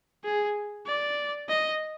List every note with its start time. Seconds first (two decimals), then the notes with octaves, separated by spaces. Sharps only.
0.24 G#4
0.87 D5
1.49 D#5